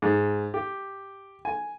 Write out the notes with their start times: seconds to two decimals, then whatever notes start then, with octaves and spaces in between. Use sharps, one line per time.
0.02 G#2
0.54 G4
1.45 G#5